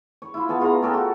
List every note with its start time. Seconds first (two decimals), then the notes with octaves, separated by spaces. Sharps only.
0.22 C#5
0.34 E4 F4
0.48 B3 G#4 C#5 A5
0.60 B3 F4 G#4 A#5
0.82 C#4 A4 A#4 G5
0.94 F#4